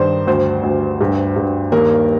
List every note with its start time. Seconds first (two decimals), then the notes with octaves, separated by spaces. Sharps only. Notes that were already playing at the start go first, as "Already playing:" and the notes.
Already playing: G2 D#3 C5 D5
0.27 D2 C5
0.63 D2
1.01 G2
1.36 G2
1.72 D#2 A#4